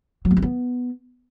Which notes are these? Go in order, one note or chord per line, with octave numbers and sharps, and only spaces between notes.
F#3
A#3
C4
B3